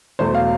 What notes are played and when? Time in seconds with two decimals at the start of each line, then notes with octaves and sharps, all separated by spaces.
0.19 E2 B2 F#3 A3 C5
0.35 F5